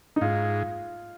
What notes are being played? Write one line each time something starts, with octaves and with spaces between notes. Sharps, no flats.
D#4
G#2 F4